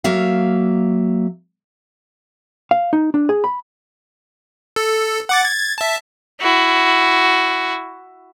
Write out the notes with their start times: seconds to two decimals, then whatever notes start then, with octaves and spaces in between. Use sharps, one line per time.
0.04 F#3 A#3 E5 F5
2.71 F5
2.93 D#4
3.14 D4
3.29 G#4
3.44 B5
4.76 A4
5.29 F#5 D6 A6
5.43 G#6 A6
5.78 E5 A5
6.41 E4 F#4